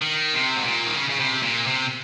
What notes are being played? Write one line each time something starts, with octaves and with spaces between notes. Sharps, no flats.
D#3
C3
G#2
A#2
D#3
C#3
C#3
C3
A#2
C3